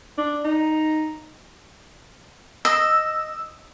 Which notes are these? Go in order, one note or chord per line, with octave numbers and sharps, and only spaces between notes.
D4
D#4
D#5 E6